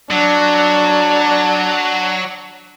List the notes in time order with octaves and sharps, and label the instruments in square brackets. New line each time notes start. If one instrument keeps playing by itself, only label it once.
[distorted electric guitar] F#3 [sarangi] D4